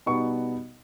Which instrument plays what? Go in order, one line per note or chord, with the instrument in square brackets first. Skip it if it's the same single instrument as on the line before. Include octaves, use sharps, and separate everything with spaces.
[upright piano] B2 G3 B3 D#4 C#6